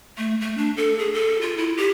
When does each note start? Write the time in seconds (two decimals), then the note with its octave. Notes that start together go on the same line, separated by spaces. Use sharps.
0.18 A3
0.41 A3
0.58 D4
0.77 A4
0.99 G#4
1.14 A4
1.41 F4
1.57 E4
1.77 G4